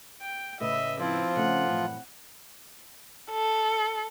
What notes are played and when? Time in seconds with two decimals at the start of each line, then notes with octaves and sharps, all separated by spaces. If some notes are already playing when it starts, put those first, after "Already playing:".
0.21 G5
0.60 A2 C#3 B4 D#5 E5
1.00 F3 C4 E4 F4
1.36 C#3 A3 C#4 F#5
1.67 F#2 A2 E3
3.31 A4